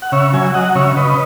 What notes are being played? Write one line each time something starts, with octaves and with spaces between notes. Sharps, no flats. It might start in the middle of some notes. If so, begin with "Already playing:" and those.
F#5
C#3 C#5 E5
F#3 E5 G#5
F#3 D#5 F#5
C#3 C#5 E5
C#3 B4 D#5